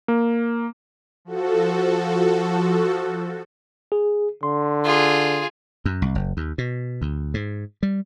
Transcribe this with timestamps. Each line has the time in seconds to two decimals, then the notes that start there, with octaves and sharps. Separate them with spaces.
0.08 A#3
1.25 F3 F#4 A4
3.92 G#4
4.43 D3 C6
4.85 F4 G#4
5.85 F#2
6.02 C2
6.15 F#1
6.37 D#2
6.58 B2
7.02 D2
7.34 G#2
7.83 G3